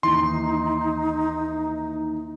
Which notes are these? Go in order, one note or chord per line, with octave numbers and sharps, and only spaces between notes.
D#2 E3 D#4 C6